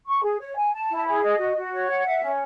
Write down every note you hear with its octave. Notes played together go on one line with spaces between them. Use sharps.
C#6
G#4
C#5
G#5
A5
E4
G#4
D#5
F#4
F#4
C#5
F#5
E5
C#4